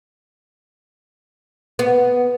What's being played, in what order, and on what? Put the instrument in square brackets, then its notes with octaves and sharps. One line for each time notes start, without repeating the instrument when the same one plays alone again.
[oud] B3